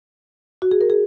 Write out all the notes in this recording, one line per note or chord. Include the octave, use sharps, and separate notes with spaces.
F#4
G#4
A#4
G#4